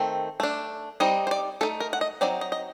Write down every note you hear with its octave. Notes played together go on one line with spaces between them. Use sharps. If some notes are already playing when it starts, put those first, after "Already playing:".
Already playing: D#3 A3 C4
A3 D4
G3 C4 D#4 D#5
C5
D5
A3 D#4 A4
A#4
F#5
D#5
F#3 C4 D#4 D5
D#5
D#5